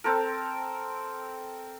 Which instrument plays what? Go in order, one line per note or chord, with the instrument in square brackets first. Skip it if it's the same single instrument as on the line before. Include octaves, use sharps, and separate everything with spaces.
[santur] C4 A4 A#4